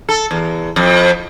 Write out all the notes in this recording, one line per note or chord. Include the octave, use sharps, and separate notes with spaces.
A4
E2
F2